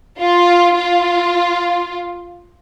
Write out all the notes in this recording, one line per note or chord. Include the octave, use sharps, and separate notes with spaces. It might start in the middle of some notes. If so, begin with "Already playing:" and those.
F4
F4